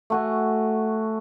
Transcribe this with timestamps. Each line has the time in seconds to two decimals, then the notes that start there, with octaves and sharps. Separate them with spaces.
0.10 A3 F#4 G#5